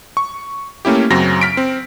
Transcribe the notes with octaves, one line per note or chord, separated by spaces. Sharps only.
C#6
A3 A#3 C#4 E4 G4
F#2 C#3 F#3 C4 A#6
F6 B6 D7
C4